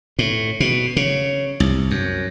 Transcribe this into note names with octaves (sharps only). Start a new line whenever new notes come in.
A2
B2
C#3
C2
F#2